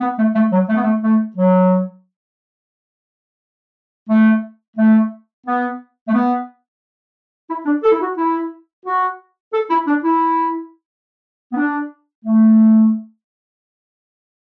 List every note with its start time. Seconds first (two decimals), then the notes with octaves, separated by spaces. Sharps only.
0.01 B3
0.17 A3
0.35 A3
0.52 F#3
0.69 A3
0.76 B3
0.82 A3
1.03 A3
1.37 F#3
4.09 A3
4.77 A3
5.45 B3
6.08 A3
6.12 B3
7.49 E4
7.65 D4
7.83 A4
7.92 E4
8.00 F#4
8.17 E4
8.85 F#4
9.53 A4
9.70 E4
9.87 D4
10.04 E4
11.52 B3
11.57 D4
12.25 A3